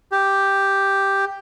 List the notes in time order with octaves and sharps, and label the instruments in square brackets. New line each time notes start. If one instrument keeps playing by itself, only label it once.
[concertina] G4